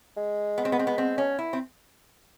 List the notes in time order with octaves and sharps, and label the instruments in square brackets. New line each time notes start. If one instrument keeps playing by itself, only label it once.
[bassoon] G#3
[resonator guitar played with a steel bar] B3
C4
B3
C4
B3
C4
C#4
E4
C4